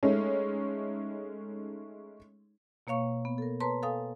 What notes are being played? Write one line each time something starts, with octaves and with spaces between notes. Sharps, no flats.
G#3 A3 C#4 D#4
B2 A#3 C#5 F5 C#6
B3
A4 A#4
B4 C#5 A5 A#5 C6
A4 F5 G#5 D#6